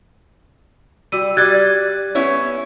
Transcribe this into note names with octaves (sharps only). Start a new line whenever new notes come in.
G3 F#4 E6 D#7
G3 D5 F#6 G#6 A6
B3 C#4 E4 C#5